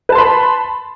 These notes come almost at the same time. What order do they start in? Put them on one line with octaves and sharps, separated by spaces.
B4 A5 C6 B5